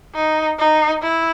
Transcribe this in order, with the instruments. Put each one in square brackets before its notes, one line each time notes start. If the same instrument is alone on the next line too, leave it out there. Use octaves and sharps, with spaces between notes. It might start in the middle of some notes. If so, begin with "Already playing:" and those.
[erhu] D#4
D#4
E4